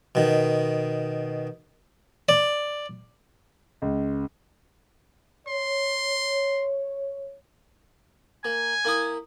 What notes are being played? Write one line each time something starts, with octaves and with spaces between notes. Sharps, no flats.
B2 D#3
D5
C#2
C#5 C6
A#3 G#5
A#3 E4 D#6